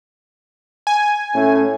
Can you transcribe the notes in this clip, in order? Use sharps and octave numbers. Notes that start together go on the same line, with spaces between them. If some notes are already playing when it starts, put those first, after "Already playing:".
G#5
A2 A3 C#4